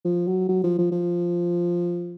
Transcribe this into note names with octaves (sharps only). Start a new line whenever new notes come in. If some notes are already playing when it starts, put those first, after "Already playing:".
F3
F#3
F#3
F3
F3
F3